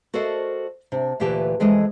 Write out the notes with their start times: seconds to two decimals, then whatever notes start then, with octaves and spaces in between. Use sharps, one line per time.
0.14 F#4 A4 A#4 C5 D5 D#5
0.92 C3 D4
1.20 D2 A#2 E3 G4 B4 A5
1.60 F2 E3 G#3 A4 D#5